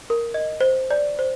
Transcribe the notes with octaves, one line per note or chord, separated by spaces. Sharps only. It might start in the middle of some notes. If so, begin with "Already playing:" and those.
A#4
D#5
C5
D5
C5